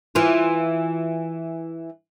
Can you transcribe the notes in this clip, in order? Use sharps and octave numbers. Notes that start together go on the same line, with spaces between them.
E3 F4